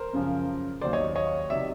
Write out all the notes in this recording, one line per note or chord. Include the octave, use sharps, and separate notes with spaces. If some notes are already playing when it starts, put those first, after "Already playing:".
Already playing: A#4 C5
F#2 C#3 F3
D#2 D#3 F#3 C5 D5
C#5 D#5
C#5 D#5
C3 D#3 F#3 D5 E5